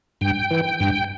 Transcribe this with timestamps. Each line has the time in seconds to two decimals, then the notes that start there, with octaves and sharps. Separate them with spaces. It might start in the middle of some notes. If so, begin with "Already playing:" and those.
0.21 G2 G5
0.51 E3
0.80 G2